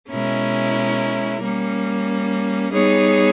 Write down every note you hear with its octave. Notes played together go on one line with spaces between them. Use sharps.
B2 G#3 C#4 E4 A#4
G3 A#3 C#4
G3 B3 D#4 G#4 C#5